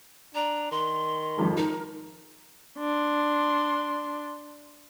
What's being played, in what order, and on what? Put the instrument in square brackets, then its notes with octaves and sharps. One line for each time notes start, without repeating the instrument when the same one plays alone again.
[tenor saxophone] D4 [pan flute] A#5
[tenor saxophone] D#3 [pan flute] C6
[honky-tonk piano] G#1 F2 G#3
[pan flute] D#4 [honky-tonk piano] A#4
[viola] D4 C6